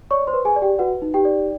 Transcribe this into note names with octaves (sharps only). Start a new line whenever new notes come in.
C#5 D5 C#6
C5 C6
B4
G#4 G#5
D5
G4 G5
F#4 B4 F#5
D#4
G4 G5
D5